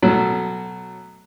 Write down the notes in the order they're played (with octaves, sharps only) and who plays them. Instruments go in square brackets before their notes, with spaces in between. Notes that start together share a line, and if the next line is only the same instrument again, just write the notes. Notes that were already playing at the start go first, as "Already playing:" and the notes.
[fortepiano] B2 F#3 A3